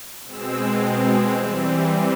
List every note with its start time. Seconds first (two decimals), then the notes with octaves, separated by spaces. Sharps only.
0.24 B2 G#3 C4 E6
1.33 E3 G3 C4 E6